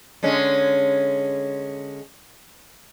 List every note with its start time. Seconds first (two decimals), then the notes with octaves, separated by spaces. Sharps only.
0.23 D3 G#3 C#4